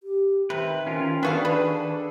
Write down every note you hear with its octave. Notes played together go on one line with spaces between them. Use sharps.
G4
C3 D#3 B4
C#4 F4 A#4
B3 D4 F#4 G#4 A4 F5
B4